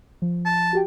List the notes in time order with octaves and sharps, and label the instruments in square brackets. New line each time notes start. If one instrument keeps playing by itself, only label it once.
[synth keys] F3
[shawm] A5
[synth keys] F#4 G4 G5